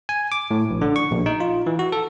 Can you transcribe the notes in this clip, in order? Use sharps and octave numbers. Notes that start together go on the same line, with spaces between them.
G#5
D6
A2
A#1
D3
C#6
A#1
D#4
F4
E3
F#4
A4